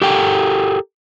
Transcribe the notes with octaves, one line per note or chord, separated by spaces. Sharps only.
G4 A4 A#4 G5